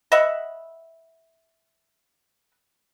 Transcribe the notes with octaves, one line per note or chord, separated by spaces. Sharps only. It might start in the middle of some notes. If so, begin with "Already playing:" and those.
D#5 E5 F#5 B5